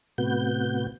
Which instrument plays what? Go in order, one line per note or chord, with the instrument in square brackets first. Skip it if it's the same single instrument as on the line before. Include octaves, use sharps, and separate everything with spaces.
[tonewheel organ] A2 C3 B3 F#4 G6